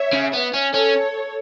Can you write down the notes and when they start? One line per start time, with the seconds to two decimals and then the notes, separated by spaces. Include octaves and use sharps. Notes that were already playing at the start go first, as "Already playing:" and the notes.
Already playing: C#5 E5
0.13 C#3
0.33 B3
0.54 C#4
0.74 C#4 A4 C#5